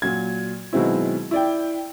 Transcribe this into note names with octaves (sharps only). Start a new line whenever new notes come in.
A#2 F#3 G#6
B2 D#3 F#3 G#3 C4 E4
E4 D5 G5